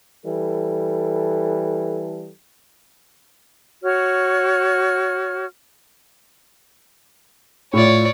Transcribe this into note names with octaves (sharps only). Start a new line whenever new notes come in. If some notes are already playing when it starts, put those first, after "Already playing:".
E3 G3 A4
F#4 C#5 F6
A2 F4 C#5 D5